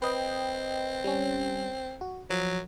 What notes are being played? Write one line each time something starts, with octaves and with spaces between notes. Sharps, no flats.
C4 B4 D#5 G5
G3 C#4
F#4
F3 F#3